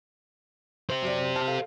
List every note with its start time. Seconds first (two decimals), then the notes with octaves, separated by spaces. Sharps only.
0.90 G4 C5
1.02 F#2 D5
1.36 A5 F6
1.48 A4 F5